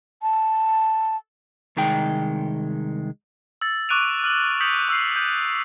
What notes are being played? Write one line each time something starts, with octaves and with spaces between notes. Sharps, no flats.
A5
C2 D#3 G#3 G5
E6 A6
C#6 D6 F#6 D7 D#7 F7
F6 F#7
D#6 G6 B6 C#7 F7 F#7
C#6 E6 F6 C7
G6